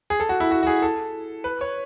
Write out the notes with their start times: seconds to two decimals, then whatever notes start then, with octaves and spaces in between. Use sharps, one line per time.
0.10 G#4
0.20 A4
0.29 F#4
0.40 E4
0.51 F#4
0.63 F#4
0.67 G#4
0.82 A4
1.44 B4
1.61 C#5